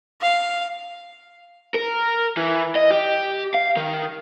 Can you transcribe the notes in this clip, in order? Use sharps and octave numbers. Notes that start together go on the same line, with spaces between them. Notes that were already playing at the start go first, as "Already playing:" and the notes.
F5
A#4
E3
D#5
G4
F5
D#3